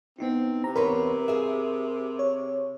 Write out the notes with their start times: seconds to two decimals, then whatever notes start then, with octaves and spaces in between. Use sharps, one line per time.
0.19 B3 C4 D#4 E4
0.64 C3 A#5
0.76 E2 A#4 B4 C#5 B5 C6
1.28 G#4 E5
2.19 C#5